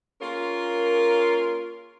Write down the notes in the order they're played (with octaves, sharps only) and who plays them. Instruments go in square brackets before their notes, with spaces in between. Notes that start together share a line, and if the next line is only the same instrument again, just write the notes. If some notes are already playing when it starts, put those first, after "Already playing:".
[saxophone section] A#3 C#4 F4 G#4 A#4